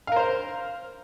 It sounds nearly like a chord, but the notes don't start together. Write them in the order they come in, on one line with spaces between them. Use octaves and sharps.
F5 A#4 C5